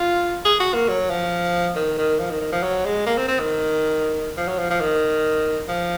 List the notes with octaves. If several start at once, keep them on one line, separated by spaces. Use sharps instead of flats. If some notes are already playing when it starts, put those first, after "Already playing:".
Already playing: F4
G#4
F#4
A#3
F#3
F3
D#3
D#3
F3
D#3
D#3
F3
F#3
G#3
A#3
C4
C4
D#3
F3
F#3
F3
F3
D#3
F3